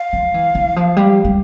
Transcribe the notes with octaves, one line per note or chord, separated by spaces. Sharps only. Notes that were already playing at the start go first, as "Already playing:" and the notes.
Already playing: F5
F3
E3
E3
F3
G3
G3